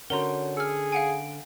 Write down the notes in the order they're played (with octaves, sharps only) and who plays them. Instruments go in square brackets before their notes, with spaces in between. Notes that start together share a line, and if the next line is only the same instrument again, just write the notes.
[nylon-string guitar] D3 C#4 [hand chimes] F#4 C#5 F#5 [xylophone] A#4 A#5 C6
[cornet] G#4 [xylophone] E6 F6 [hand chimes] C#7
[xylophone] F5 F#5 G#5 [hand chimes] D7